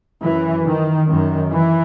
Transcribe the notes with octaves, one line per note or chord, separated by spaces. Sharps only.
F#2 E3
D#3
F#2 D#3
E3